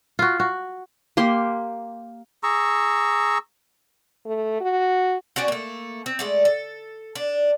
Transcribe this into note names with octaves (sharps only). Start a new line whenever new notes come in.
F4 F#4
F#4
A#3 G4 C6
G#4 A#5 C#6 E6
A3
F#4
C#4 F#4 D5 G5
A3 A#3
C4
G#3 A3 D5
A4
D4